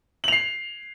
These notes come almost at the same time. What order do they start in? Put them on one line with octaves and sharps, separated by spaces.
F#7 F7 C7